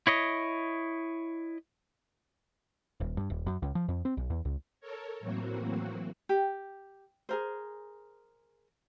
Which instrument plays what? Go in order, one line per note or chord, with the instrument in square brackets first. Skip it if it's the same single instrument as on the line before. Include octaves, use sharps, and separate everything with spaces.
[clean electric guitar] E4 C#5 D#5
[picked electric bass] D#1
G2
D#1
F#2
C#2
F3
F2
C4
B1
E2
C#2
[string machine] A4 A#4 C#5
A2 E3 F#3 A#3 C4 F#4
[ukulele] G4
G#4 A#4 C5